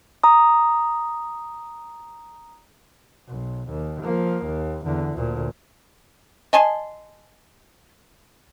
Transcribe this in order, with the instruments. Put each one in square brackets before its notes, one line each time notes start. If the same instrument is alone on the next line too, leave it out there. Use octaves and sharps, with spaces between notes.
[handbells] A#5 D#6
[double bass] B1
D#2
F3 A#3
D#2
E2 D3
D2 A#2
[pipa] D#5 G#5 A5 C6